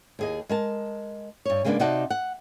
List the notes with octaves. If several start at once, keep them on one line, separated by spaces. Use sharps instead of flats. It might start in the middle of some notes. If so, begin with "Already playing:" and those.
D#2 G#4 D#5
G#3 A#4 A5
G2 C#5
C#3 G#3 A#3 B3 D4
C3 D#4 F#4 D5 F#5 A5
F#5